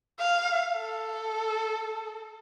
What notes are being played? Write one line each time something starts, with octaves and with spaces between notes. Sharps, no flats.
F5
A4